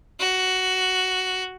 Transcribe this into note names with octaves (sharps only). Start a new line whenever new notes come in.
F#4